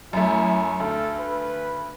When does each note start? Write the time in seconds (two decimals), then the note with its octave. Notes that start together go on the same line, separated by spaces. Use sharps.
0.13 F#2 A3 E4
0.80 D2 A4
1.19 B4